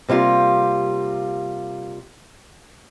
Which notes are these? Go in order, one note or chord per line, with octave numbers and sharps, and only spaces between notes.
C3 G3 A#3 F4